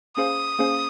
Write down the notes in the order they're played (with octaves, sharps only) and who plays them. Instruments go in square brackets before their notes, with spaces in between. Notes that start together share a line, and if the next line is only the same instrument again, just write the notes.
[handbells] A#3 C#4 G#4 C5 F5 [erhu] D#6
[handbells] A#3 C#4 G#4 C5 F5